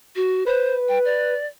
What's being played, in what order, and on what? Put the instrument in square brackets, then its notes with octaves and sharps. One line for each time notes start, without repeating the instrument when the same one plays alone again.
[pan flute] F#4
[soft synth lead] B4 [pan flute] C5
[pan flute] G5
D5